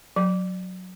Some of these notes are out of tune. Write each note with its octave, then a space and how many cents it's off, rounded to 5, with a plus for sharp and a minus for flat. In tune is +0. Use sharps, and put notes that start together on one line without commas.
F#3 -10